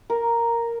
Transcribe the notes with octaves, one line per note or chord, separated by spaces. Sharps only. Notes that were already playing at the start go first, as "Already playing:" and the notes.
A#4